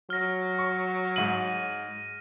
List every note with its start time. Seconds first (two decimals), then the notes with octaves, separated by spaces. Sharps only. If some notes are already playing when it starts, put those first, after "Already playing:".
0.10 F#3 F6 A#6
0.59 C#6
1.16 G#2 D#7 F#7